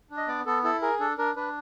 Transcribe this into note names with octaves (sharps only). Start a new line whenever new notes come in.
D4
D#5
B3 D5
B3 A4
E4 A4
G#4 A#4
D4 A4
D4 A#4
D4 B4